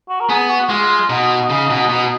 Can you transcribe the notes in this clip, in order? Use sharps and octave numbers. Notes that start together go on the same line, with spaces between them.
F#4
A#4
B3 G#4
F#4
G#3 F4
B2 D#4
C#3
B2
B2